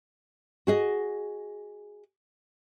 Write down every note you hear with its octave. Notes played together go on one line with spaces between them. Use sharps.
F#4 G#4 D#5